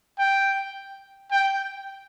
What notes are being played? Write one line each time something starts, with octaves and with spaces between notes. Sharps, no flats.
G5
G5